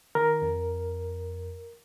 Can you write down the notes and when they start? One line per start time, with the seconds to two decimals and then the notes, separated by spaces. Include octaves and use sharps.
0.15 D#3 A#4
0.42 F2